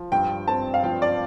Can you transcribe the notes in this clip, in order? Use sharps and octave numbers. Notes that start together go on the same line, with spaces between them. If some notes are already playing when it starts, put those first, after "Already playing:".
Already playing: F3
G2 G5
C4 A5
F5
F3 G5
D5